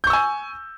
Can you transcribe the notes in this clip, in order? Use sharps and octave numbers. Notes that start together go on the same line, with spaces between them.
G#5 C#6 E6 G6